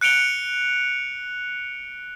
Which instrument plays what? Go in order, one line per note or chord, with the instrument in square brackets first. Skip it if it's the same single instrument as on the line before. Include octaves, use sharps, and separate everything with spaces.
[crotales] F#6 C#7 D7 F7 G7